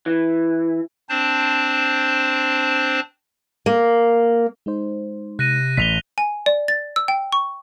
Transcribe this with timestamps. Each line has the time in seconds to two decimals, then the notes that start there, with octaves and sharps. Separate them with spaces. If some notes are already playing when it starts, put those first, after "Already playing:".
0.06 E3
1.09 C4 D4 C5 A5
3.66 A#3
4.66 G#3 D#4 C5
5.39 C3 F#6 A#6 D#7
5.77 A1 B6 F7 G7
6.18 G#5
6.46 D5
6.68 A6
6.96 E6
7.08 G5
7.32 C#6